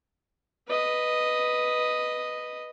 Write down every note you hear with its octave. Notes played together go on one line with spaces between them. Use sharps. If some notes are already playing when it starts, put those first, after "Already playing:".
B4 D#5